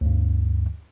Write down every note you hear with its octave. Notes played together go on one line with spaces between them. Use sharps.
D2 G2